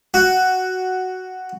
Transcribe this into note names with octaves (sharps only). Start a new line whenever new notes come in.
F#4